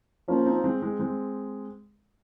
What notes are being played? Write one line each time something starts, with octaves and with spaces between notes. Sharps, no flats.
F3 A#3 C#4
C4 D#4
G#3 C4
G#3 C4
G#3 C4